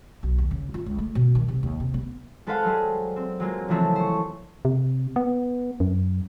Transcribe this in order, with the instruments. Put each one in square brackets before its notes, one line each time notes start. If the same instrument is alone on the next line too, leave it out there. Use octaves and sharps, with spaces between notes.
[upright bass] B1
D#2
C#3
F4
C#2
A3
B2
D#3
C3
D#2
C3
B3
[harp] G#3 A4 B4 C5 F5 F#5
F#3 G3 G#4 C5
C4
F#3 G#3 A#3 F4
C#3 E3 F3 G#3 A3 C4
C5 C#6
[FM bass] C3
B3
F#2